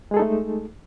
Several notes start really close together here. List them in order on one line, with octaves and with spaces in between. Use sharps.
G#3 G#4 A4 D#4 A3